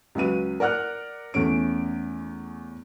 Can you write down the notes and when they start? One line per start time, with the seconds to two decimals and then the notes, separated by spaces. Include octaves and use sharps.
0.15 C#2 F#3 B4 D#7
0.60 A#4 D5 F#5 F6 F#6
1.34 E2 A3 C#4 D7